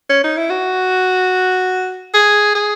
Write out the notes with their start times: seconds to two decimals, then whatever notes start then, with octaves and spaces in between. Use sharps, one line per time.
0.10 C#4
0.24 D#4
0.37 E4
0.50 F#4
2.14 G#4
2.55 G#4